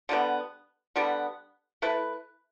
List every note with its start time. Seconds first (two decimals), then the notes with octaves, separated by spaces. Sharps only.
0.09 D3 G3 B3
0.96 D3 G3 B3
1.82 A3 E4 B4